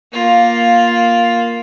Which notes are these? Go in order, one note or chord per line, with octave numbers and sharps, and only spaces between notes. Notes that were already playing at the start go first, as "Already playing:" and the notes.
A#3 F4